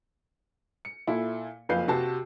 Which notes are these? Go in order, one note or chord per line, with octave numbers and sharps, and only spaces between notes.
C#7
A#2 E4 A4
F#1 F2 B4 F5 G6 C7
C3 F#4 B4 A5